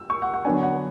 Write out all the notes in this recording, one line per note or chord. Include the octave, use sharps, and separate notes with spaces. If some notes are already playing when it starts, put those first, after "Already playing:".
Already playing: E6
C#6
F#5
F#5
D3 F#3 B3 D4 G#5
F#5